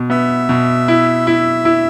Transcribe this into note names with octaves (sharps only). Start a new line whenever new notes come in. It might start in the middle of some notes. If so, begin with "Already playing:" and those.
Already playing: B2
B3 E5
B2
E4
E4
E4